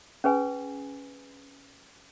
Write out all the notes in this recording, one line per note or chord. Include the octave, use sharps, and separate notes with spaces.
C#4 G#4 B4 G#5